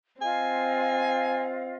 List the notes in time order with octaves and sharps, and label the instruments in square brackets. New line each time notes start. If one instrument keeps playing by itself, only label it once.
[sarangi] C4 [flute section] F4 D#5 F5 [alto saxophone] G#5